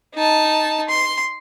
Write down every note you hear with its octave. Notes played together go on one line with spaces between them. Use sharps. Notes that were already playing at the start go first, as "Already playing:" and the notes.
D#4 A5
C6